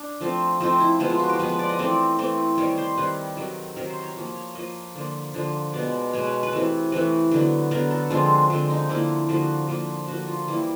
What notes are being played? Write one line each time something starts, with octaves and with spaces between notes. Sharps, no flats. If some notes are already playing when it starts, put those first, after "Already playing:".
Already playing: D4
F3 A3 C4
F3 A3 C4 D#4
E4
F3 G#3 B3 E4
F4
F#4
G4
F3 G#3 B3 B4
B4
D5
D#5
E3 A3 C4 D5
E3 A3 C4
C3 D#3 G3 C#5
C5
C3 D#3 G3 B4
C3 D#3 F#3
C3 D#3 F#3 A#4
C5
C#5
F3 A#3
C#5
F3 A#3 D#5
D3 F3 A#3
D3 F3 A#3
B2 G#3 B3 D5
B2 G#3 B3 C#5
B4
B4
C3 E3 A3
C3 E3 A3 B4
D3 F#3 B3
D3 F#3 B3 A#4
A4
D3 F3 G#3 C4 F4
D3 F3 G#3 C4
D#4
D3 F3 A#3 E4
D3 F3 A#3 F#4
D3 F3 A#3
D3 F3 A#3 F#4
F4
E3 G3 A#3 E4